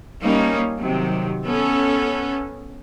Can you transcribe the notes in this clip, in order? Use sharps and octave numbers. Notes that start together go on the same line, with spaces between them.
G3 A#3 C#4 D#4
C3 D#3 F#3
B3 C#4 A4